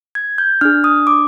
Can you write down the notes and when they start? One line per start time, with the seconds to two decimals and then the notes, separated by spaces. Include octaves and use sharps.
0.15 G#6
0.38 G6
0.61 D4 G#4 F6
0.84 D#6
1.07 D6